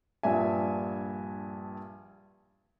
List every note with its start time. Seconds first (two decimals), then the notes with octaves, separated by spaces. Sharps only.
0.23 A#1 G2 E5 G#5